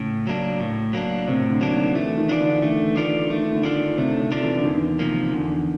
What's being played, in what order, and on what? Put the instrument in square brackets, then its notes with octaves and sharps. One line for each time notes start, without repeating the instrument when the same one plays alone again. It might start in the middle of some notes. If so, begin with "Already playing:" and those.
Already playing: [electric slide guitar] A2 [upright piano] C#3
[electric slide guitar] F#3 A#3 D4
A2
F#3 A#3 D4
[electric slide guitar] A2 [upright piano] C3
[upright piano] D3
[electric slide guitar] F#3 A#3 D4
[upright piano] D#3
[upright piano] E3 [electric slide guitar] A3
[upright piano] D#3
[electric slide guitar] D4 F4 A4 D5
[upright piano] D3
[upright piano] E3 [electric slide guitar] A3
[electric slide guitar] D4 F4 A4 D5
[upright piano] D#3 [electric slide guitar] A3
[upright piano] D3
[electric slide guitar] D4 F4 A4 D5
[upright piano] C3 [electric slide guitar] A3
[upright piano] C3
[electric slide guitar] D4 F4 A4 D5
[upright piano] E3
D3
[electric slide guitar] E2 [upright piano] D#3
[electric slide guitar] C3 F3 A#3
[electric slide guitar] E2 [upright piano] D3